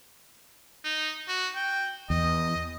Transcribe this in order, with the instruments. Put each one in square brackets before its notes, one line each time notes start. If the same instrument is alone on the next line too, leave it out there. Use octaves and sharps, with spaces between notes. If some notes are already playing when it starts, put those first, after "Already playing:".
[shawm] D#4
F#4
G5
[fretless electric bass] E2 [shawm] D#5